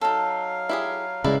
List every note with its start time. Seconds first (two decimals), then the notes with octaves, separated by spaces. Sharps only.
0.01 F#3 D#4 A4 F5
0.69 E4 G4 G#4
1.24 C#3 G#3 E4 B4 D5